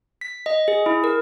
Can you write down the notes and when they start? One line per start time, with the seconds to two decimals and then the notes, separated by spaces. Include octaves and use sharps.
0.21 B6
0.46 D#5
0.68 G#4
0.86 E4
1.04 A#4